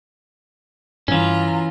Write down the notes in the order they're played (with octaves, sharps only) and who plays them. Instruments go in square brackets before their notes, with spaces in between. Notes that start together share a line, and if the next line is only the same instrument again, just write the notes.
[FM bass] G2 [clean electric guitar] E3 C#4 [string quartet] F4 A#5